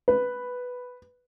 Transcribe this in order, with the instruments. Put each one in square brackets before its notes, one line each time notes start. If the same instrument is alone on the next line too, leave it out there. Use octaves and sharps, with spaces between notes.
[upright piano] B4